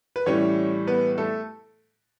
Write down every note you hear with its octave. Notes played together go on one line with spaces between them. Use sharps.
B4
A2 E3 G3 C#4 C#5
B3 B4
A3 A4